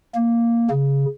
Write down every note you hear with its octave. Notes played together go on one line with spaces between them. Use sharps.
A#3
C#3